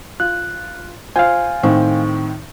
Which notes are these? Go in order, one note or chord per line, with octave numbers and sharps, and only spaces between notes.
F4 F#6
F4 C5 F5 G#5
A2 D#3 C4